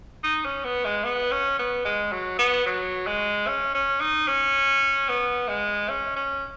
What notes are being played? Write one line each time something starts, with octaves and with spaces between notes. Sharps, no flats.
D#4
C#4
B3
G#3
B3
C#4
B3
G#3
F#3
B3
F#3
G#3
C#4
C#4
D#4
C#4
B3
G#3
C#4
C#4